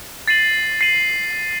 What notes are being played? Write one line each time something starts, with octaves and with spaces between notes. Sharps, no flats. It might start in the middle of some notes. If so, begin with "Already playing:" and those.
A6 C7 D#7 F#7
A6 C7 D#7 F#7